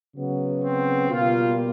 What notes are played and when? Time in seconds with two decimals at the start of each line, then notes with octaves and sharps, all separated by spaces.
0.17 C#3 F#3 B3
0.63 C4
1.11 B2 G3 A#3 F4